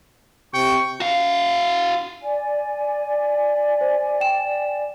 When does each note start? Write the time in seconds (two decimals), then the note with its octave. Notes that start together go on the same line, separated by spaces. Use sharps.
0.54 C3 G5 C#6
1.00 F#4 F5
2.22 D5 G#5
3.81 C5
4.20 G5 E7